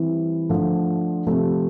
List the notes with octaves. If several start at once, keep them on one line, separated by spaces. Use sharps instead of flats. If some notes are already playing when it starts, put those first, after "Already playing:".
Already playing: E3 G3 C4 E4
D3 F3 A3
C3 F3 A3